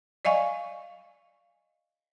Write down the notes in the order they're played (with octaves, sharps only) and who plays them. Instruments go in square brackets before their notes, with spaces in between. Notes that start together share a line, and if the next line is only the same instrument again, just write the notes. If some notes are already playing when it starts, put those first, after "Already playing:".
[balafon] D5 D#5 F5 G#5 C#6